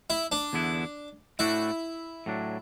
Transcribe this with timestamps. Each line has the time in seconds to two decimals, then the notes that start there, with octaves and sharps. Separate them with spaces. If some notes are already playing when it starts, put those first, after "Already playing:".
0.10 E4
0.32 D4
0.53 E2 D3 B3 E4
1.39 A2 A3 D4 E4 F#4
2.26 A2 F#3 D4